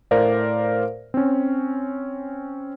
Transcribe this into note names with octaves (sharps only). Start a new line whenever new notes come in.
A2 A#4 C5 D5 F5
C4 C#4